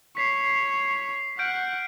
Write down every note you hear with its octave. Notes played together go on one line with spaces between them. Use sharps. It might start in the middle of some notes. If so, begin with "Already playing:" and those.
C#5 B6 C7
F#5 F6 G6 D7